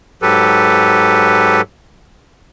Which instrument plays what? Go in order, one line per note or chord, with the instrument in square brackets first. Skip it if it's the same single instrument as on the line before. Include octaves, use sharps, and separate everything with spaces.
[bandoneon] G#2 F#3 G4 A4 B4